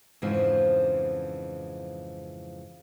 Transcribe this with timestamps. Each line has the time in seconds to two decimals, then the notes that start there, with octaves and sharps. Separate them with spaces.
0.22 F2 G#2 C#3 E3 F3